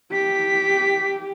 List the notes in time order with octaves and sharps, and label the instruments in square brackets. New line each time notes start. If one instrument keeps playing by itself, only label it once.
[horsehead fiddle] G4 [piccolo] B6